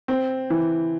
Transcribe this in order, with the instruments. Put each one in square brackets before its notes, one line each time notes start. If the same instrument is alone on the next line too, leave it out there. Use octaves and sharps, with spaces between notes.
[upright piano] C4
E3